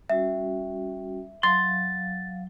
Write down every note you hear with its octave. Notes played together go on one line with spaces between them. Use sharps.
G3 C#4 F#4 E5
F#3 F5 C6 A6